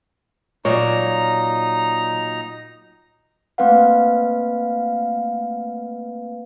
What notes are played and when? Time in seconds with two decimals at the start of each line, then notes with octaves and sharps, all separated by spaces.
0.65 A#2 F#3 D#4 C#5 D5 A#5
3.58 A3 A#3 C4 B4 F5 F#5